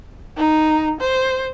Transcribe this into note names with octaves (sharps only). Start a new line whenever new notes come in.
D#4
C5